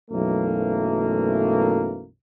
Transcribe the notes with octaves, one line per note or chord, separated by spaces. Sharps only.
B1 F#2 E3 A3 A#3